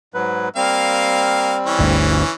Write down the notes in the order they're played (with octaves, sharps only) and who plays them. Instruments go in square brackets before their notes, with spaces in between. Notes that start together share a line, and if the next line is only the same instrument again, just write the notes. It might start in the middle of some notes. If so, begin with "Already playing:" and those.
[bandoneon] G#2 F#3 B4
[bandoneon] G3 C4 [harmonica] A#3 F5
[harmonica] E3 C#4
[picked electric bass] G1 D2